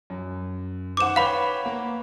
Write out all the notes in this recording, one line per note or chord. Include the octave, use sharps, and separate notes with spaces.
F#2
D#3 C5 F#5 D6 E7
B4 C#5 F5 G5 B5
A#3 F#5